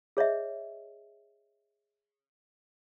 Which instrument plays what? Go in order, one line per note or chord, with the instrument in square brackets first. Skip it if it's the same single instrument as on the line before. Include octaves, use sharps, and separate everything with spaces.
[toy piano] G#4 C#5 D#5 E5